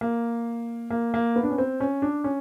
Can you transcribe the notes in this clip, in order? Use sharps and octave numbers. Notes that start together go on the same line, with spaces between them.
A#3
A#3
A#3
B3
D4
C#4
C4
C#4
D4
C#4